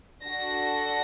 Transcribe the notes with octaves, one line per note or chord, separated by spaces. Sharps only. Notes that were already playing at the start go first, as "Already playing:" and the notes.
D4 F#4 A4 A#6